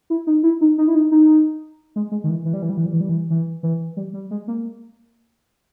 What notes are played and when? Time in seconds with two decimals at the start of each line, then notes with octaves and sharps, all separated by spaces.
0.10 E4
0.27 D#4
0.43 E4
0.61 D#4
0.78 D#4
0.88 E4
0.95 D#4
1.11 D#4
1.96 G#3
2.12 G#3
2.24 D#3
2.29 E3
2.45 E3
2.53 G3
2.62 E3
2.70 G3
2.77 E3
2.86 G3
2.93 E3
3.01 G3
3.09 E3
3.30 E3
3.63 E3
3.97 G3
4.14 G3
4.31 G#3
4.48 A#3